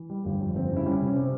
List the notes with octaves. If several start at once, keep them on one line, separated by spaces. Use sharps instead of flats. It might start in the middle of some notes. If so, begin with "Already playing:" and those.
Already playing: E3
G3
G1 G4
F2
G1 C4
C#3
E4
G3 C#4
C3
C#4
C3